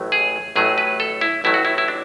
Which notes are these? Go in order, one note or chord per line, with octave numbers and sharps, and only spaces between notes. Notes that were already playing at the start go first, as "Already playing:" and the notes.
Already playing: A1 A2 F#3 A3
G#4
A1 A2 F#3 A3 G#4
B4
A4
E4
A1 A2 F#3 A3 E4
F#4
E4
E4
D4